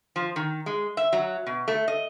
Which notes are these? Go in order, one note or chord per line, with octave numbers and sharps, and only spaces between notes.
F3
D#3
G#3
E5
F#3
B2
A3
D#5